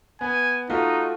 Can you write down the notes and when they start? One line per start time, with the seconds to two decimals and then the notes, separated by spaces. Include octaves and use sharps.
0.21 B3 G#5
0.70 A3 D#4 F4 F#4